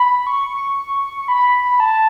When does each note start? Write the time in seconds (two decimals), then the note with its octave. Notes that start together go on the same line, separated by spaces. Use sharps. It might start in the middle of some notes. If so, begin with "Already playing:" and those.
Already playing: B5
0.27 C#6
1.28 B5
1.80 A5